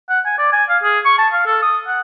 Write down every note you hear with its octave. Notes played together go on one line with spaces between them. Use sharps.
F#5
G#5
D5
G#5
F5
G#4
C#6
A5
F5
A4
D#6
F#5